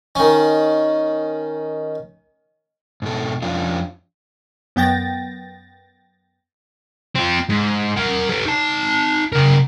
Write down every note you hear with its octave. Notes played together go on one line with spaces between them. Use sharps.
D#3 C#4
G#2 B2 A4
F2 C#4 D4 F4
F#2 B3 G5 A6 A#6
C4 F4
G#2
A#4 F#5
A4 B4
D#4 A5
C#3 A#4